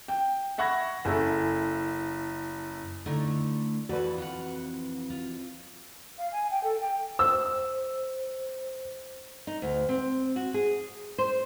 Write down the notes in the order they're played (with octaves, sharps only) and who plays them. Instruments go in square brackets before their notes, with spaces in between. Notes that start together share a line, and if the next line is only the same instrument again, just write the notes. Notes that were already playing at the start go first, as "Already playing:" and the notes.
[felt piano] G5
E5 F#5 B5 C#6 G#6 A#6
F#1 E4 A4
[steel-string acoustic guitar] D3 [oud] A3 D#4 E4
[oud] F2 E3 [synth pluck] F#4 B4 [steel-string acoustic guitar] A4 D5 E5
[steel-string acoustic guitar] F4 F#5
F4
[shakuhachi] F5
G#5
G5
A4
G5
[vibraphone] C5 [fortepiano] E6
[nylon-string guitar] D#4
D2
C4
F#4
G#4
C5